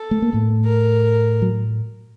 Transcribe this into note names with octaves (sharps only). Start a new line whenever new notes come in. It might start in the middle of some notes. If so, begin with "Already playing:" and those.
Already playing: A4
A3
A#3
A2 A3
A#4
F#3